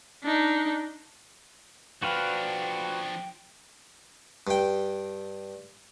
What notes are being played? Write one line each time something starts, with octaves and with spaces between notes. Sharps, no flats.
D4 D#4
F3 D4 F#4 B4 F5 G5
G2 G5